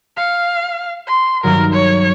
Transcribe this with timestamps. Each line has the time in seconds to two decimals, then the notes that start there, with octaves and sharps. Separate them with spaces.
0.17 F5 F6 C#7
1.07 C6
1.44 G2 D#3 F#3 A#4
1.73 C#5